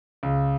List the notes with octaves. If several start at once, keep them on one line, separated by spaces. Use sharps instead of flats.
C#2